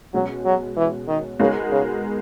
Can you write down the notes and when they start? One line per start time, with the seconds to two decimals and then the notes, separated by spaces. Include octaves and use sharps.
0.14 B2 F#3 G#3 C#4
0.45 F#3
0.77 E3
1.08 D#3
1.40 C#3 G#3 B3 D#4 F#4 A#4
1.71 C#3